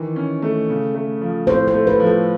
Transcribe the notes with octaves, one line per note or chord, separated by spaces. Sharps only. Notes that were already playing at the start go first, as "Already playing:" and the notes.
Already playing: D#3 E3
C#4
A3
C#3
A3
F3
A2 C5
C5
A3
B4
F3
A4